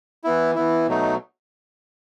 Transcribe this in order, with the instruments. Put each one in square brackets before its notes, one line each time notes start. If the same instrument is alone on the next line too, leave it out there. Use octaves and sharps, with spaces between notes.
[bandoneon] E3 B3 E4
E3 B3 E4
B2 F#3 A3 D#4